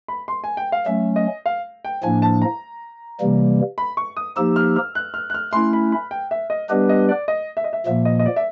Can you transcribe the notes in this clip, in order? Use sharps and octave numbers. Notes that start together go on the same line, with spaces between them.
B5
C6
G#5
G5
F5
F#3 A3 C#4 E5
D#5
F5
G5
A2 F3 A#3 D4 G#5
A5
A#5
C3 E3 G3 A#3
B5
C#6
D#6
F3 A#3 D#4 G4 E6
F6
F6
F#6
F6
F#6
F6
A3 C#4 E4 C6
B5
B5
G5
E5
D#5
G3 B3 D4 G4 B4 D#5
D#5
D5
D#5
E5
D#5
E5
A#2 F3 A#3 E5
D#5
D#5
D5
E5